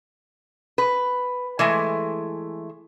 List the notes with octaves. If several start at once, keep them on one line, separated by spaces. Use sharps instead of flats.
B4
E3 G#3 A3